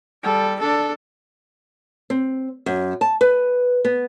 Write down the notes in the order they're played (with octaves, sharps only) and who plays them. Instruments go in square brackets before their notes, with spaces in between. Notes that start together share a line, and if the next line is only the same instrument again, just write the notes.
[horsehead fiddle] G3 A4
D4 A4
[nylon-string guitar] C4
F#2
A5
B4
B3